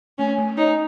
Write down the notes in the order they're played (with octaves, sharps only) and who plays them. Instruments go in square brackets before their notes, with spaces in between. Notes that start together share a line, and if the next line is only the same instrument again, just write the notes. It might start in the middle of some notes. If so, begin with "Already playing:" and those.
[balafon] A3 [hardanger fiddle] C#4
[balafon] A3
[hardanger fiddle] D#4 [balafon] C#5